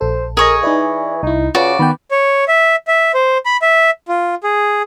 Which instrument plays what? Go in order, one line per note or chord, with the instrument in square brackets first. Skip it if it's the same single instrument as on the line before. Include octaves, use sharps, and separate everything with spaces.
[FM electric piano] A#1 A4 [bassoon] C5
[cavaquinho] G#4 C#5 D#5 [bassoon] A#4
[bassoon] E3 [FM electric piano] D#4 B4 D5
[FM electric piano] C2 E4 [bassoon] D#4
[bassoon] C#3 [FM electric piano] F4 B4 [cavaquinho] F#4 D5
[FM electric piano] D#3 B3 G5 [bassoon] B4
[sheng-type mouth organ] C#5
E5
E5
C5
B5
E5
F4
G#4